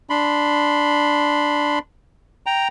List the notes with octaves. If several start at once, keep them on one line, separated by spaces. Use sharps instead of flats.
D4 B5 C6
G5 A#5